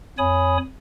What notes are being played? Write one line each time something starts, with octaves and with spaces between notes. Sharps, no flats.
F2 C#5 G#5 B5 D#6